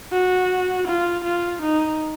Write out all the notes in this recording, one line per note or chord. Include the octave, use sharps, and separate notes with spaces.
F#4
F4
F4
D#4